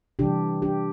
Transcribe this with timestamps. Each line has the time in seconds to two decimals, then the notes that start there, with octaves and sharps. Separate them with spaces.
0.19 C3 E3 G3 D4 G4
0.62 D4 G4